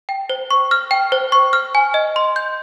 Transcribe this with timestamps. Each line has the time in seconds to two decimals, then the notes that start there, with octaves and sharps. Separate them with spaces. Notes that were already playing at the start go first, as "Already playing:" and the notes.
0.09 G5
0.30 C5
0.51 C#6
0.71 F6
0.91 G5
1.12 C5
1.32 C#6
1.53 F6
1.75 G#5
1.94 D#5
2.16 C6
2.36 G6